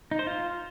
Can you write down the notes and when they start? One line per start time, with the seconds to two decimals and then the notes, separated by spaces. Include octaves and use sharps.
0.11 D#4
0.19 C5
0.27 F4